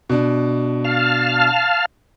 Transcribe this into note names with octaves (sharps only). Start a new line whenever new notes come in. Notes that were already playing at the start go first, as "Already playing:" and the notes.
B2 D4
F5 A5 F6